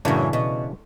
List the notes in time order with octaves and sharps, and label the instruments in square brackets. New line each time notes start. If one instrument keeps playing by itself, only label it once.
[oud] F#2 A2 [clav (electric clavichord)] C#3 E3 D4
[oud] B2